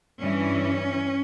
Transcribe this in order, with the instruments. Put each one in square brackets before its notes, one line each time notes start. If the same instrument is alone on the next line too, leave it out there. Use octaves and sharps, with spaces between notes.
[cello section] G2 E3 C#4